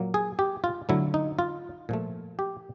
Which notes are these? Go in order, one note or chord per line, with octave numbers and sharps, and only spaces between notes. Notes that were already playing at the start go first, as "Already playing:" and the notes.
Already playing: A#2 F#3 A#3
G#4
G4
F4
D3 F#3 A3 E4
D#4
F4
A#2 F3 A3
G4